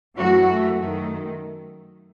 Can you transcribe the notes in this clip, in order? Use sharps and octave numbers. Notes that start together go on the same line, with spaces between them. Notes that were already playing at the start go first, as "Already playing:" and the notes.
F#2 E3 F#3 A3 F#4
A3
F#2 D#3 A3